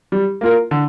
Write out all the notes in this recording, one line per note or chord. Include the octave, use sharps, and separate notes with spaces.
G3
A#3 F4 A#4
D3